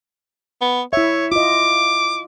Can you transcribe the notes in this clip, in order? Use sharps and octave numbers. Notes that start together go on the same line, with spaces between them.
B3
E4 C#5 E5
F4 D#5 D6